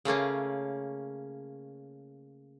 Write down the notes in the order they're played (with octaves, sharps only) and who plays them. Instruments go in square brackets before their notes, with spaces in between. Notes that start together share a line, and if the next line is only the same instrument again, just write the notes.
[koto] C#3 A3 A#3 C#4